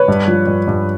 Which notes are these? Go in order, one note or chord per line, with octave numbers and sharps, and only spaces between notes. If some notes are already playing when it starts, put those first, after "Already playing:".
Already playing: B4 C#5
G2
F3
G2
G2